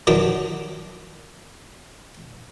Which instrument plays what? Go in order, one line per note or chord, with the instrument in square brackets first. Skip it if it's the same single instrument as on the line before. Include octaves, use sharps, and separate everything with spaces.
[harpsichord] D#3 F#3 D4 B4